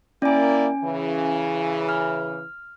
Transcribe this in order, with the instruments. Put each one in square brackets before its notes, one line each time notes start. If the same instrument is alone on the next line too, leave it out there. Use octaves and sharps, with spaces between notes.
[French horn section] A#3 E4 D5 [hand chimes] C#4 G#5
[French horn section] C#3 E3
[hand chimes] F6